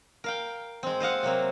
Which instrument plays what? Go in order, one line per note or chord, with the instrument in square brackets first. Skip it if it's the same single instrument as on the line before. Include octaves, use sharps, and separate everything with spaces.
[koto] A#4 F5 G5
G#3 C4
C5 D#5 F5 F#5
C3 F#3 A#3 C4